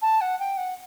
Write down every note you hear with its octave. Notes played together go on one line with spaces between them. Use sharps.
A5
F#5
G5
F#5